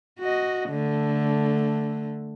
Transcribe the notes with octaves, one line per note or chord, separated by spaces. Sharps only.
F#4 D#5
D3 A3